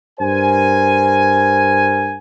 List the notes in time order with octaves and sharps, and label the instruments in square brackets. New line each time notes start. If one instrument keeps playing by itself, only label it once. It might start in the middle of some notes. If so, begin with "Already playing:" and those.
[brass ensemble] G2 A#4 C5 G#5